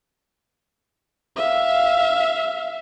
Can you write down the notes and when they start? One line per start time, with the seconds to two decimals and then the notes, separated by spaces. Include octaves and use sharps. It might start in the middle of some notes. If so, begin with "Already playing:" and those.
1.36 E5 F5